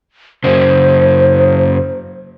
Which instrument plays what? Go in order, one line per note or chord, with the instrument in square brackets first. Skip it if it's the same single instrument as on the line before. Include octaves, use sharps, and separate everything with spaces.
[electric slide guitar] F#2 C#3 [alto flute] C5